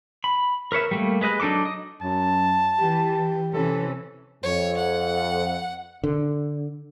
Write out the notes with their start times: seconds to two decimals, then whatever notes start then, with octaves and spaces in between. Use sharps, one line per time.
0.24 B5
0.72 A#4 B4 C#5 E5
0.91 G3 A3 A#3
1.21 G#3 B4 D#5 F#6
1.40 F#3 D4 D#4 A4 D6
1.65 D#5
2.02 F#2 A5
2.80 E3 G4
3.53 C3 E3 C#4 A4
4.43 F2 C#5
4.77 F#5
6.04 D3